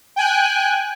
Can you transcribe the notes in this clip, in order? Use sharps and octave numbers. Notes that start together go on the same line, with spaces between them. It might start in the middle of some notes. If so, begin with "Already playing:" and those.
G5 G#5 F#6